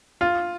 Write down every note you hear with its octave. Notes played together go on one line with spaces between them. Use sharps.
F4